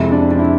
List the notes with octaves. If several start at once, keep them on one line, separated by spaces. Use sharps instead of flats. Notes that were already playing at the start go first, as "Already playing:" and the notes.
Already playing: F2 C3 G#3 E4
D4
D4
E4